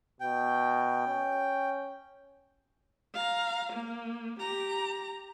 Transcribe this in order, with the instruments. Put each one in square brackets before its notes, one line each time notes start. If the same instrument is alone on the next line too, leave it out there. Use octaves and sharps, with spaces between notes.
[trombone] B2 [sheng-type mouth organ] G5
[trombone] C#4
[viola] F5 A#5
A#3
G4 A#5